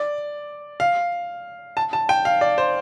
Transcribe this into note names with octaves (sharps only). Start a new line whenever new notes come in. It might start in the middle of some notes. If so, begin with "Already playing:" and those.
Already playing: D5
F5
A5
A5
G5
F5
D5
C5